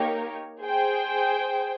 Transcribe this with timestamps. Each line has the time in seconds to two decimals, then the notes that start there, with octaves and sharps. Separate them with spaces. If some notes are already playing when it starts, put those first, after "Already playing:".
Already playing: A#3 D#4 G4 A#4 C#5
0.60 G#4 C5 G5